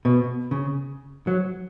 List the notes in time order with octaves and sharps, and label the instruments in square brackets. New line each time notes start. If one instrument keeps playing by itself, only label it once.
[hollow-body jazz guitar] B2
C#3
F#3